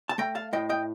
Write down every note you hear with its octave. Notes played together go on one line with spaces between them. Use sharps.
A5
A3 G5 A#5
F5 A5
A2 D#5 G5
D#5 G5